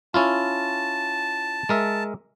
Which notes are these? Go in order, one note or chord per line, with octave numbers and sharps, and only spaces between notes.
C#4 E4 F4 A5
G#3 A#4 E5